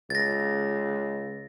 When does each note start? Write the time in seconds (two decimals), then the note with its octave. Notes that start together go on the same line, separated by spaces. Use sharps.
0.10 C#2 A6 A#6